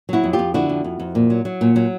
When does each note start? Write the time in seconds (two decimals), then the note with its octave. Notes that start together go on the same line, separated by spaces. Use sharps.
0.09 F#3 E4 F#4
0.24 F2
0.33 F4 G4
0.39 F2
0.54 D3 E4 F#4
0.69 F2
0.84 F2
1.00 F2
1.15 A#2
1.30 F#3
1.45 F#3
1.61 A#2
1.76 F#3